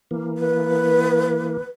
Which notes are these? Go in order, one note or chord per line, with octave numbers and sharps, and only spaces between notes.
E3 A#3
B4